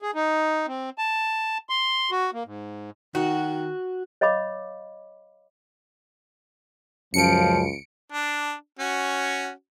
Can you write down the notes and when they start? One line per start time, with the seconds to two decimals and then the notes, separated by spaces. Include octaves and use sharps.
0.02 G#4
0.15 D#4
0.67 C4
0.98 A5
1.69 C6
2.11 F#4
2.33 A#3
2.46 G#2
3.15 D#3 F#4
4.21 C#5 D#5 F5 B5 D6
7.14 C#2 F#2 F3 C#7 D7
8.12 D4
8.79 C#4 F#4